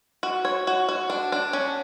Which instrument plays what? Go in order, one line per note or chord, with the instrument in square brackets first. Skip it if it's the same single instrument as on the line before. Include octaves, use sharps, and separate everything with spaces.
[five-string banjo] F#4
C#5
F#4
F#4
D4
D4
C#4